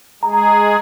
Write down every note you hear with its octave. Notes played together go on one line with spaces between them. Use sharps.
G#3 G#4 A#5